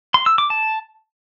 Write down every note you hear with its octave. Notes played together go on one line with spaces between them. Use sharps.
C6
E6
D6
A5